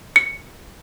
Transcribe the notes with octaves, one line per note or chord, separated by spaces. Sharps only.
C#7